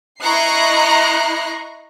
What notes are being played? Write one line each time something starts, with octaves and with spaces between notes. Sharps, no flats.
E4 D#5 A#5 C#6 F#6 C7